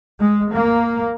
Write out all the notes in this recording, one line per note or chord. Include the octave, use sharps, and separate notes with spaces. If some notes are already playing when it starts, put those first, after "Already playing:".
G#3
A#3